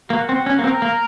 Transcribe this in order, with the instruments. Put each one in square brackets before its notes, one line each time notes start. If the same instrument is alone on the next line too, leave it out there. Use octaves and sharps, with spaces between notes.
[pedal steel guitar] A#3 [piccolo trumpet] F#4
[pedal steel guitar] C4
C#4
A#3
[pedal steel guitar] C4 [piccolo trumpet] A#4
[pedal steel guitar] A#3